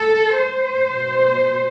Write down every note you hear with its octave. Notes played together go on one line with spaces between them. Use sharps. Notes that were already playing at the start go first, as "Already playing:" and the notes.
Already playing: A4
C5
B2